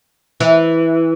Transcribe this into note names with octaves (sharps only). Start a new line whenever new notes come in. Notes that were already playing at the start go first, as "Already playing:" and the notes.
E3